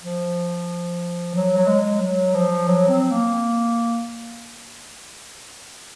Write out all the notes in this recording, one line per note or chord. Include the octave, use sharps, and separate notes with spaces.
F3
F#3
F#3
G#3
F#3
F3
F#3
C4
A#3